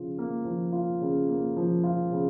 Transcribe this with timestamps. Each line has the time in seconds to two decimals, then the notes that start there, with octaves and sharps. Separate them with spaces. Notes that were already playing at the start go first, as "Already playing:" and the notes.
Already playing: C#3 F3 F4
0.19 A#3
0.45 F3
0.73 F4
1.01 C#3
1.29 A#3
1.57 F3
1.84 F4
2.12 C#3